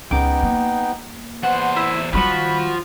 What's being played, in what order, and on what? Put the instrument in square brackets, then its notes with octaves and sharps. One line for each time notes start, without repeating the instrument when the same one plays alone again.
[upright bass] C#2 [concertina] B3 D#4 G5 [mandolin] D6
[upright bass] A#3
[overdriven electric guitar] E2 C5 [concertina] B3 [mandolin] F#5
[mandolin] E4
[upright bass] D#3 G3 [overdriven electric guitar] F3 [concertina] F#4 [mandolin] B4 B5 C#6